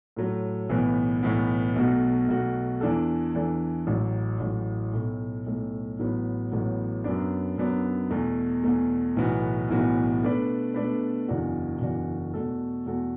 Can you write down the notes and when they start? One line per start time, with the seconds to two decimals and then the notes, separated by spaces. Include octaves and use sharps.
0.16 A2 F#3 A3
0.69 B1 A2 E3 B3
1.23 B1 A2 E3 B3
1.76 B1 B2 A3 F#4
2.28 B1 B2 A3 F#4
2.81 E2 E3 D4 A4
3.34 E2 E3 D4 A4
3.87 A1 A2 F#3
4.40 A1 A2 F#3
4.93 B1 A2 A3
5.46 B1 A2 A3
5.99 A1 A2 F#3 B3
6.51 A1 A2 F#3 B3
7.04 F#2 F#3 B3 D4
7.58 F#2 F#3 B3 D4
8.11 E2 B2 A3
8.63 E2 B2 A3
9.17 B1 A2 E3 B3 F#4
9.69 B1 A2 E3 B3 F#4
10.23 B2 A3 D4 B4
10.74 B2 A3 D4 B4
11.28 F#1 E2 E3 D4 F#4
11.81 F#1 E2 E3 D4 F#4
12.34 E2 B2 A3 F#4 A4
12.86 E2 B2 A3 F#4 A4